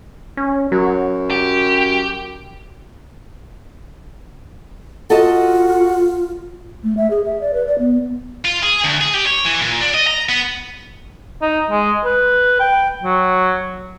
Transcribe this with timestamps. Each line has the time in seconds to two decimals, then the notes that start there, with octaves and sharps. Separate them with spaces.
0.37 C#4
0.72 F#2 F#3
1.30 G4
5.10 F4 F#4 A4 D#5 A5
6.84 A3
6.97 E5
7.10 G#4
7.25 E5
7.41 D5
7.54 B4
7.67 D5
7.79 B3
8.45 F4
8.63 G#4
8.84 D2
9.01 G#4
9.14 G4
9.26 C#5
9.45 E3
9.61 A#2
9.81 D4
9.94 D#5
10.07 A#5
10.29 B3
11.42 D#4
11.70 G#3
12.04 B4
12.60 G5
13.03 F#3